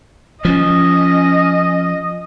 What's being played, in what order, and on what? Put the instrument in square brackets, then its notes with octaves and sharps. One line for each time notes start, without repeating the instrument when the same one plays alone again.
[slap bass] F3 [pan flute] C#4 [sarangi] D#5